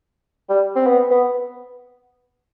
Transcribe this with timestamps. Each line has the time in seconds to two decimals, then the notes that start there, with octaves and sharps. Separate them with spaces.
0.50 G3
0.76 C4
0.87 B3
1.11 B3